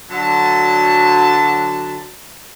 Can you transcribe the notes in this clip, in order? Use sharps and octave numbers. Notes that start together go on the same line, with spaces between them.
D3 F#3 A5